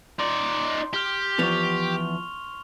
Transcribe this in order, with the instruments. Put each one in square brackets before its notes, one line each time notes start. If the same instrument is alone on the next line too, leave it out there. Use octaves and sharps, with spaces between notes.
[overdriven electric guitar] D#4 D5 [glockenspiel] C6
[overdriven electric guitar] G4 [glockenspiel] F6 G7
[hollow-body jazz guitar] E2 F3 B3 [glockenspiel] C#6 F7